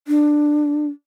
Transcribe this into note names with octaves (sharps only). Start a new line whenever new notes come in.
D4